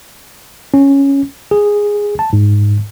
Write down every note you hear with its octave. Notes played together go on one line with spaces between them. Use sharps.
C#4
G#4
A5
G#2